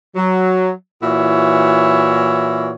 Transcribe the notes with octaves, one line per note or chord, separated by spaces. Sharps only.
F#3
A#2 E3 E4 F#4 C#5